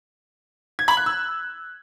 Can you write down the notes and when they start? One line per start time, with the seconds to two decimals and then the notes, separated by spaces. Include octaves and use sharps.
0.79 G#6
0.88 B5
0.97 F#6
1.06 E6